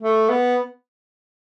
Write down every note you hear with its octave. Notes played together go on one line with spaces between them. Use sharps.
A3
B3